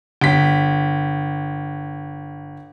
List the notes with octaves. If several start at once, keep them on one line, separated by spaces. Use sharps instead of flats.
G1 B6